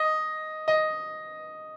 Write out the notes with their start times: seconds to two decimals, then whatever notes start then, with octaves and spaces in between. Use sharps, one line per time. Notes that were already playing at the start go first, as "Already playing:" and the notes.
Already playing: D#5
0.68 D#5